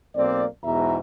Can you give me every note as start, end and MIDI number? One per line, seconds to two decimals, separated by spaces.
0.15 0.45 35
0.15 0.45 58
0.15 0.45 60
0.15 0.45 74
0.63 0.98 40
0.63 0.98 44
0.63 0.98 47
0.63 0.98 52
0.63 0.98 76
0.63 0.98 82